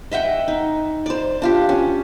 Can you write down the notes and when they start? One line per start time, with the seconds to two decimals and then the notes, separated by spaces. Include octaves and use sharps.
0.12 D#5 E5 F#5 G5
0.48 D#4
1.06 C5 D5
1.42 D4 F4 G4
1.69 C#4